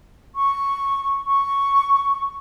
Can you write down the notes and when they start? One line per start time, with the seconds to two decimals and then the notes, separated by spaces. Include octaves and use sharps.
0.35 C#6
1.27 C#6